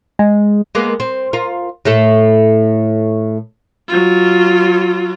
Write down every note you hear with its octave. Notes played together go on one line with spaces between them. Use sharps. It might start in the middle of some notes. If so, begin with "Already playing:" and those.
G#3
G#3 A#3 B3
C4
F4 A#4
A2 A3 A4
F#3 F4